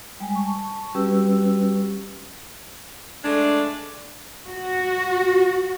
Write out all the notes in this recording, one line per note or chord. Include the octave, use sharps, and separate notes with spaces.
G3 G#3 G#5
A5 C#6
G3 C#4 F#4 G4 B4 E6
G#3 A3 D4
F#4